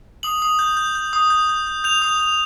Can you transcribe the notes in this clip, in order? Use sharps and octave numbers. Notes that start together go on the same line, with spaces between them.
D#6 F#7
D#6
G6
G6
G6
D#6
G6
G6
G6
G6 F7
D#6
G6